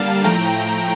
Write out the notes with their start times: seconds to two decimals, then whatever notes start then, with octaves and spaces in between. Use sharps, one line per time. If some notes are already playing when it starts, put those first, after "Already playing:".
Already playing: D3 G3 A#3 F5 A5
0.24 A2 F3 A3 G5 A#5